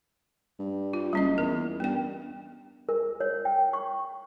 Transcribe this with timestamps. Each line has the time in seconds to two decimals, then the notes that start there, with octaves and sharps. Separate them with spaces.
0.59 G2
0.93 F4
1.13 F#1 G3 C#4 D#5
1.38 E2 A#4
1.80 G2 B3 G5
2.89 A#4
3.21 C#5
3.45 G5
3.73 C#6